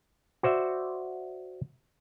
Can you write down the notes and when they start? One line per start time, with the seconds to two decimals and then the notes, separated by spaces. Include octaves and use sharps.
0.43 F#4 C5 D5 E5